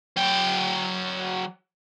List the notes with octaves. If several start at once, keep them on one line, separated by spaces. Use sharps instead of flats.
F#3 G5